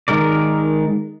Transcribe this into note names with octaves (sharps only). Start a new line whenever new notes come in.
D#3 G#3 A#4 D5